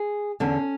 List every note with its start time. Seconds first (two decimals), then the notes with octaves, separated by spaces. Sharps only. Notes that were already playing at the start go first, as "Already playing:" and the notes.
Already playing: G#4
0.40 E2 D3 C#4